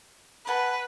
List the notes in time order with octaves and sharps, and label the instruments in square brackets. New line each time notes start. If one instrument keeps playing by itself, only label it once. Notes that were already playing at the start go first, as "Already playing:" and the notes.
[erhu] B4 [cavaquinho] F#5 G#5 A5